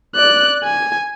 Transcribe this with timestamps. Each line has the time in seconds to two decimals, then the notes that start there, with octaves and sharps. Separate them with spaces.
0.16 D5 F#6
0.64 G#5